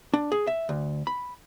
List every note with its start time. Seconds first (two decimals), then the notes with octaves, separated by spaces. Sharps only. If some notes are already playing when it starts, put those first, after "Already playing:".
0.14 D4
0.32 G#4
0.47 E5
0.69 D2
1.07 B5